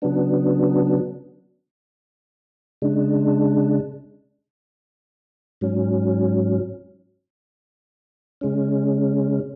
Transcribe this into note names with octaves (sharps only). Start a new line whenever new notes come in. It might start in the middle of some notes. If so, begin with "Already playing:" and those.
C#3 F#3 B3 D4
C#3 G#3 D4
G#2 F#3 C#4
C#3 G#3 C#4